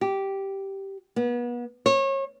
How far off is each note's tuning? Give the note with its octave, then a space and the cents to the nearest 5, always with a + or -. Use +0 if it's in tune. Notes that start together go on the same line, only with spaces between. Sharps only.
G4 -10
B3 -35
C#5 -30